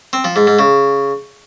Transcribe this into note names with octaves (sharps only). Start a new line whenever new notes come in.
C4
F3
G#2
G#2
C#3